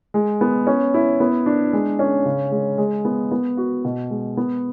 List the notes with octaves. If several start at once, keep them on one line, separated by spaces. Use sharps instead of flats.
G#3
B3
C#4
E4
B3
D4
G#3
C#4
C#3
G#3
G#3
B3
B3
F#4
B2
G#3
B3